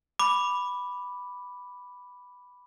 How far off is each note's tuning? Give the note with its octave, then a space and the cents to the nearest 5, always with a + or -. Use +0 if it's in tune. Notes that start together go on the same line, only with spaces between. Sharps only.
B5 +0 D6 +0